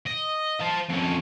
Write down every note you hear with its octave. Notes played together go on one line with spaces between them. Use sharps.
D#5
C5 A5
F2 C#4